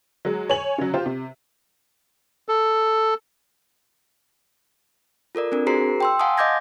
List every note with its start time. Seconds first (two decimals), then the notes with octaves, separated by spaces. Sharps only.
0.25 F#3 G#3
0.49 C#5 G#5 F#7
0.78 C#3 F#3
0.94 F4 G4 C5
1.06 C3
2.48 A4
5.35 F4 A4 A#4 D5
5.52 C4 D4 A#4
5.67 F#4 G#4 A#4 C5 A#5 C7
6.00 G5 C6 E6
6.19 F5 F#5 G#5 A5 C6 D#6
6.38 D#5 F5 D6 G6 G#6 A#6